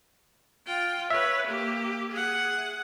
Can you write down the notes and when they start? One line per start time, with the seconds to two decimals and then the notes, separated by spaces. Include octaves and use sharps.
0.66 F4 G5
1.11 B4 C#5 E5
1.46 A#3 G4
2.11 G#4 F#5